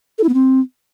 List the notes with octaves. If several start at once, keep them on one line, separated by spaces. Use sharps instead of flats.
A4
E4
B3
C4